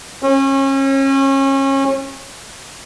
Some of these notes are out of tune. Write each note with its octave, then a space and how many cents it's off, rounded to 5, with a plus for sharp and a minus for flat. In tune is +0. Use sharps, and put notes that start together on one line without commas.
C#4 -30